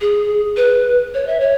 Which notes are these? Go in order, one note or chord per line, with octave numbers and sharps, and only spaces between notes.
G#4
B4
C#5
E5
C#5